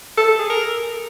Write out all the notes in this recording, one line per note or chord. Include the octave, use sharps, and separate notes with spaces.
A4
A4
G#4
A#4